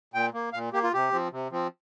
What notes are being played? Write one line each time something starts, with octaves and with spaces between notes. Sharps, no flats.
A#2 G5
A#3
A#2 F5
A#3 G4
F4
C3 G4
F3 C4
C3
F3 C4